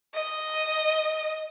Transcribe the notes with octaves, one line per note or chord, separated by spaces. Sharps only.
D#5